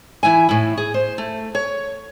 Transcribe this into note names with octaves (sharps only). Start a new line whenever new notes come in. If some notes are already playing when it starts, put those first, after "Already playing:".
E3 E4 E5 G#5
A2 E4
G#4
C5
A3
C#5